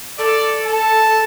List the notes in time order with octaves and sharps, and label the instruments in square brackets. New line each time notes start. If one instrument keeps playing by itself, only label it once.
[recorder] A4 [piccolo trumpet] D5
[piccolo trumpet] A5